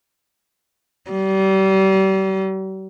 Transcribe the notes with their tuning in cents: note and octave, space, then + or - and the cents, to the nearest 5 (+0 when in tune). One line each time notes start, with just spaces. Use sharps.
G3 -35